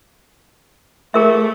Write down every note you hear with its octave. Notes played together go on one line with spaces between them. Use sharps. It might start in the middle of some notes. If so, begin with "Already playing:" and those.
A3 G#4 A#4 E5